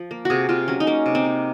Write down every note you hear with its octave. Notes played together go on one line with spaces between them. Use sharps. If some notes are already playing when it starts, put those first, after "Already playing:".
Already playing: F3
A#3
C3 F#4 G#4
C3 F4
F#3 C#4
D#4
A#3 C#4
C3
C4
A#3